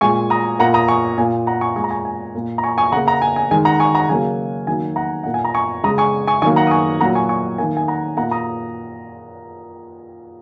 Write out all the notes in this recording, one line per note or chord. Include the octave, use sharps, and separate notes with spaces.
A#2 G#3 G#5 C#6
A#5 D#6
A#2 A#3 F#5 A#5
A#5 D#6
G#5 C#6
A#2 A#3 G#5
F#5 A#5
G#5 C#6
A#2 G#3 G#5 A#5 C#6
G#5 C#6
G#5
A#2 A#3
A#5
G#5 C#6
G#5 C#6
C#3 A#3 F#5 A#5
F#5 A#5
G#5
G#5
D#3 G#3 G#5
F#5 A#5
G#5 C#6
F#5 A#5
C#3 F#3 A#3 G#5
D#3 F#3 A#3 G#5
F#5 A#5
A#2 A#3 F#5
G#5
A#5
G#5 C#6
C#3 G#3 A#5 D#6
G#5 C#6
G#5 C#6
D#3 F#3 A#3 G#5 C#6
F#5 A#5
D#6
G#5 C#6
A#2 F#3 A#3 F#5 A#5
G#5 C#6
G#5 C#6
D#3 A#3 G#5
G#5
F#5 A#5
A#2 A#3 F#5 A#5
A#5 D#6